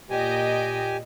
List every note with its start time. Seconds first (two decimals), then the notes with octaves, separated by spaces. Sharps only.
0.10 A#2 G4 D#5 G5 G#5